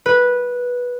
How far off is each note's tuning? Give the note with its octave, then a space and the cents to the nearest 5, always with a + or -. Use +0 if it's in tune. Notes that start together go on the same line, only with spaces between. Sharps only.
B4 -10